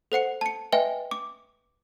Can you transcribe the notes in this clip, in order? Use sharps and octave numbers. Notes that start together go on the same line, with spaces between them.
A4 C5 F#5 C#7
A5 C#7
B4 D#5 E5 G5 G#5
D6